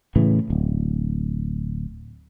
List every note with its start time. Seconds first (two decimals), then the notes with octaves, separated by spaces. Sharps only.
0.16 A2 C#3 E3
0.50 D1